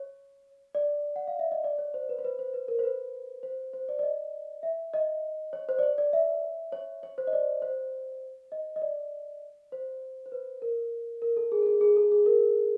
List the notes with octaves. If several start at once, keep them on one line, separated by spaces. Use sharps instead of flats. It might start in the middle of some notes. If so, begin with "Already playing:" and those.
Already playing: C#5
D5
F#5
F5
E5
D#5
D5
C#5
C5
B4
C5
B4
C5
B4
A#4
C5
B4
C5
C5
D5
D5
D#5
E5
D#5
C#5
C5
D5
C#5
D5
E5
C#5
C#5
C5
D#5
D5
C5
D#5
D#5
D5
C5
C5
B4
A#4
A#4
A4
G#4
A4
G#4
G#4
A4
G#4
A#4